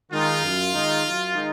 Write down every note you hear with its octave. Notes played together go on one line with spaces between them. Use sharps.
D#3 G#3 D#4 F4
F#2
D#3 G#3 D#4
F#2
D#3 G#3 D#4